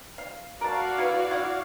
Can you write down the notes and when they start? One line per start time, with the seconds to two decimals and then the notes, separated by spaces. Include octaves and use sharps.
0.18 F5
0.61 F#4 A#4 D5 F5 A5
0.98 E4 B4
1.31 E4 F#5